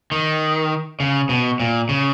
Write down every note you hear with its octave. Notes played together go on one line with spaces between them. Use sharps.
D#3
C#3
B2
A#2
C#3